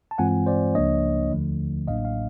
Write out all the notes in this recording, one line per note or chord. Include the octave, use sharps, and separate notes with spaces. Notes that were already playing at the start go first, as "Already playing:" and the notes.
A5
G2 E3 G#3 C4 F4 F#5 G#5
C5 D5
C#2 C#3 F3 A#3 D4 C#5 D#5
D#2 D3 F3 A3
A1 A2 F#3 A#3 D4 D#5 F5
F5